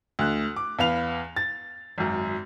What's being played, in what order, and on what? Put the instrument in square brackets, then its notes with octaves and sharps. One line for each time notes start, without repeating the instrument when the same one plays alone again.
[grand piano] D2 F#6
D6
E2 B4 F5 F7
A6
G#1 F#2